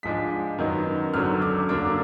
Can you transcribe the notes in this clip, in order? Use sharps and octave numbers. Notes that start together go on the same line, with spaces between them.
G#2 F3 G#3 D4 B6
F#2 D#3 F#3 B3 D#4
G#1 F#2 D3 F#3 F6
D6
F#2 D3 F#3 A#3 D4 D6